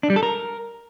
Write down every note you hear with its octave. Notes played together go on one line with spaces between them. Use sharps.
D4
G3
A4
A#4